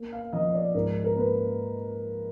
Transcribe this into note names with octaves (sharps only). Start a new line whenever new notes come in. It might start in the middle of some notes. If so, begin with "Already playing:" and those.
Already playing: A#3
F5
F3 D#5
D5
G#2 A#4
A#4
A#3 B4